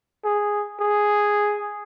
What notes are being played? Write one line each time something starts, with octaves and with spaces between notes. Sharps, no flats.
G#4
G#4